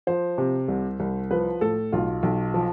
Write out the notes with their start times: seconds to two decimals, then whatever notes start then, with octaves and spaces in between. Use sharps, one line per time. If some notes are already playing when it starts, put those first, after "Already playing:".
0.07 F3 C5
0.38 C3
0.68 C2
1.00 C2
1.31 F3 B4
1.61 A2 A4
1.92 B1 F4
2.23 B1
2.54 F3